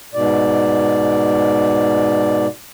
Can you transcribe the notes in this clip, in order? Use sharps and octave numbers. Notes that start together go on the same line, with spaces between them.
G#2 B2 D5